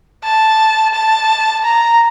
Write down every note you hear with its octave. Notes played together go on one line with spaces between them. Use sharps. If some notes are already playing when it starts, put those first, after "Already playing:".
A5
A5
A#5